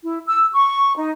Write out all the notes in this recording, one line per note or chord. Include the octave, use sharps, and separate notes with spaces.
E4
E6
C#6
D#4